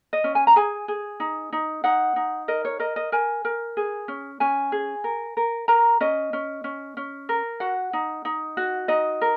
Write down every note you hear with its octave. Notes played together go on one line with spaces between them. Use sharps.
D#5
C#4
G#5
A#5
G#4 G#5
G#4
D#4
D#4
D#4 F#5
D#4
A#4 D#5
C#5
A#4 D#5
D#5
A#4 G#5
A#4
G#4
C#4
C#4 G#5
G#4
A#4
A#4
A#4 A#5
C#4 D#5
C#4
C#4
C#4
A#4
F#4 F#5
D#4
D#4
F#4
D#4 D#5
A#4